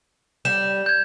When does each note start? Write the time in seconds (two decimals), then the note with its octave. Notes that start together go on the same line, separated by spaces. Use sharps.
0.45 G3 E7
0.86 G6 G#6